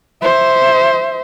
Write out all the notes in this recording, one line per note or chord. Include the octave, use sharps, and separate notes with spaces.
C5 E5